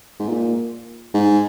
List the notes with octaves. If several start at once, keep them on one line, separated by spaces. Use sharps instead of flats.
G#2
A#2
G#2